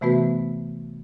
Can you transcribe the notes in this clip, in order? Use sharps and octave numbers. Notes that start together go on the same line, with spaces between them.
C3 E3 A3 B3 F#4 B4